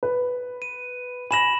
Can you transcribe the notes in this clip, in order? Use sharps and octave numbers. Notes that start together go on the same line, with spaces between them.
B4
D#7
G#5 B5 A#6 E7 F#7